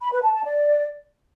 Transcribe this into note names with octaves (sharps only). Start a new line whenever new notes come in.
B5
B4
A5
A5
D5